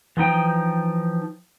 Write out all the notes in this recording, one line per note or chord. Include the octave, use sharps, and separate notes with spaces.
E3 F3 D#4 G5